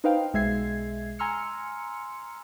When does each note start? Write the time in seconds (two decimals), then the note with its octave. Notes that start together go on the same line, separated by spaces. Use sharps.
0.04 D#4 B4 C5 F5 G5
0.33 B1 G#3 E5 G#6 C7
1.19 G#5 A#5 C6 E6 F6 C#7